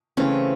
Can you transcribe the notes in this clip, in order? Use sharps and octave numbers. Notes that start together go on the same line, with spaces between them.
C#3 E3 A3 C4 C#4